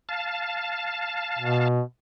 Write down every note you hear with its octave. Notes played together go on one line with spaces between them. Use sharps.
F5 A5
B2